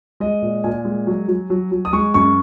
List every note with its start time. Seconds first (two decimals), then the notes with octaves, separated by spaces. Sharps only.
0.20 G#3 D#5
0.42 A#2
0.64 A#2 G#5
0.85 G#3
1.07 F#3
1.28 F#3
1.50 F#3
1.72 F#3
1.85 D#6
1.93 G#3 C#6
2.14 F#2 C#6